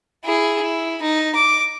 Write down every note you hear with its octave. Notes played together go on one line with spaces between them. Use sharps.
E4 G#4
E4
D#4
D6